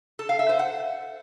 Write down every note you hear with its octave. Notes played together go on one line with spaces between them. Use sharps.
A4
F5
E5
C5
F#5